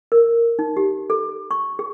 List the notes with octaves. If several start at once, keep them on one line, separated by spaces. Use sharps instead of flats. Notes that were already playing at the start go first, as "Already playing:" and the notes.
A#4
D#4
G4
A4
C#6
G#4